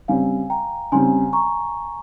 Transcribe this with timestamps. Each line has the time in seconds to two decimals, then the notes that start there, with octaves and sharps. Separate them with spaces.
0.08 C#3 G3 C4 F5 G#5
0.50 G5 A#5
0.92 C#3 G3 C4 G#5 C6
1.33 A#5 C#6